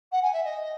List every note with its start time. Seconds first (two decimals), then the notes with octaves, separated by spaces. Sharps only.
0.12 F#5
0.22 G#5
0.33 E5
0.44 D#5